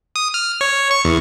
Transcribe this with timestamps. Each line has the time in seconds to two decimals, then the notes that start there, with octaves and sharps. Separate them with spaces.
0.16 D#6
0.34 F6
0.61 C#5
0.91 C#6
1.05 E2